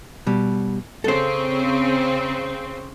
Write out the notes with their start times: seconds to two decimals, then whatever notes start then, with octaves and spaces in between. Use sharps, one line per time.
0.27 B2 G3
1.04 C#3 C4 A4 C5